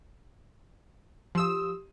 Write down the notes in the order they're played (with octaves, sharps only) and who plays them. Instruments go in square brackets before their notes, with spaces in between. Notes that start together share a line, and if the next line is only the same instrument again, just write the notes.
[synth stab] F3 E6 [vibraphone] G4 [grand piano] C6 D#6